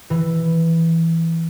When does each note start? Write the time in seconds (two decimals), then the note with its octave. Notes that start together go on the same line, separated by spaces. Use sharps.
0.10 E3